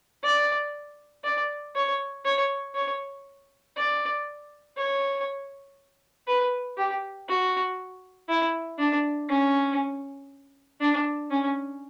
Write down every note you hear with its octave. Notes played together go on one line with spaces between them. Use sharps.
D5
D5
C#5
C#5
C#5
D5
C#5
B4
G4
F#4
E4
D4
C#4
D4
C#4